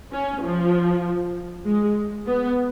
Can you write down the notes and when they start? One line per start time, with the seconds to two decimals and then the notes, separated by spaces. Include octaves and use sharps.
0.12 C#4
0.44 F3
1.65 G#3
2.26 B3